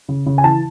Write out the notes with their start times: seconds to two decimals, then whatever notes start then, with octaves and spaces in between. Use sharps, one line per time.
0.09 C#3
0.26 C#3
0.38 G#5
0.44 E3 A5